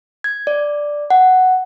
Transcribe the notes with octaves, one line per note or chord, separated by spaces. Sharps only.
G#6
D5
F#5